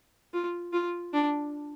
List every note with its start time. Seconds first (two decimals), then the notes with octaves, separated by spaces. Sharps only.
0.34 F4
0.73 F4
1.13 D4